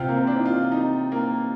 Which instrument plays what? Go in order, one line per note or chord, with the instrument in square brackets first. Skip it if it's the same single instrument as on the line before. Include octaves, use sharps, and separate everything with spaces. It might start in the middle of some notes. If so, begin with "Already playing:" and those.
Already playing: [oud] C3 [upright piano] F4
[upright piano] A#3
C4
D4
D#4
F4
D#4
A#3